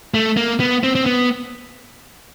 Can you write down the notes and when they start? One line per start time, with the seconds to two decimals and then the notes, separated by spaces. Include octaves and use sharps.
0.14 A3
0.37 A#3
0.60 B3
0.83 C4
0.95 C4
1.06 B3